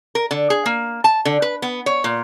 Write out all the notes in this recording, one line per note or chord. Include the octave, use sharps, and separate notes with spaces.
A#4
D3
G#4
A#3
A5
D3
B4
B3
C#5
A#2